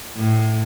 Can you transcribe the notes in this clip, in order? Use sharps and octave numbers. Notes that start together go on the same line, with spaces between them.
A2